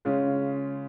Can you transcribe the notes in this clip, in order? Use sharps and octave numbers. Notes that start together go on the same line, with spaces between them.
C#3 G#3 C#4 F4